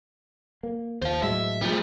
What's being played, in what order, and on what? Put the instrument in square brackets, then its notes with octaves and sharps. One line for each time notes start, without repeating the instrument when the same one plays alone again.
[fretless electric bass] A#3
[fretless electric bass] D#2 [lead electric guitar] C5 F5
[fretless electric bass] A2 F#3 G#3 [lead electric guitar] E5
[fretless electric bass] F3 [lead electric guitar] G3 A3